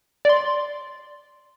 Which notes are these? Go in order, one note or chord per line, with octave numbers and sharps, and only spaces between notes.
D5 C6